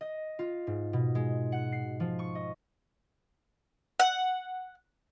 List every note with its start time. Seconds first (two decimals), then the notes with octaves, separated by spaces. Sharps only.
0.01 D#5
0.39 F4
0.67 G#2
0.93 B2
1.15 G#3
1.52 F#5
1.72 C7
2.00 F3
2.19 C#6
2.35 D#5
3.99 F#5